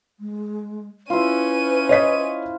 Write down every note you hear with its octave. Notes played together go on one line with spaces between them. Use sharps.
G#3
C#4 E4 F4 B4 D#7
C5 C#5 D#5 B6